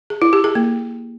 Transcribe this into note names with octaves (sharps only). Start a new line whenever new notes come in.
G#4
E4
G4
G#4
A#3